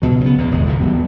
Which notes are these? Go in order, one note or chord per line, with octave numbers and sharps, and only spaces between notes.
C#2 B2 F#3
C#3 B3
E2 G#2 E3
E1 D#2 D#3 G#3
E1 C#2 G2 D#3
D#1 F#3 G3 B3